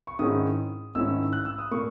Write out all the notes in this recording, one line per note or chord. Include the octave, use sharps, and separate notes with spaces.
C#6
G#2 D#3 G#3 C#4 E4 D#6
G#2 D#3 G#3 C#4 E4 E6
F#6
E6
D#6
A#2 A#3 C#6